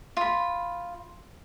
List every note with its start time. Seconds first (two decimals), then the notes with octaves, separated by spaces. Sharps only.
0.17 F4 B5